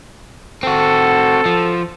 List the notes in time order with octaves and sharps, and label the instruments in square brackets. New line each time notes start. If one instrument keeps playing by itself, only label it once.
[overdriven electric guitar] C4 F#4 [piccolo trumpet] A4
[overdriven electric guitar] F3